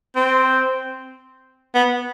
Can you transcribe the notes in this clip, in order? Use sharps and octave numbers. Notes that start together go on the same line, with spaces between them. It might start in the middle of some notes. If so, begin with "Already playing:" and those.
C4
B3